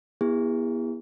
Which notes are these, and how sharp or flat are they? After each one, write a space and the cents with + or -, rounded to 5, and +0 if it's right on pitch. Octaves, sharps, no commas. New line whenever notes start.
B3 -35 E4 +0 G#4 -40